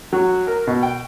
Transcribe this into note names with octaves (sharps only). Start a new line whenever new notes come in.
F#3
A#4
B2
G5